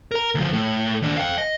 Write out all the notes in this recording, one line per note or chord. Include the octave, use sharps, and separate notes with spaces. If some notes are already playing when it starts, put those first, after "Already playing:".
A#4 A#5
D2 F3
A2
D#2 D4
F5 G5
D#5